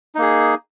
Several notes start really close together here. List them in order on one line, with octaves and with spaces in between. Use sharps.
D#4 A#3 G#4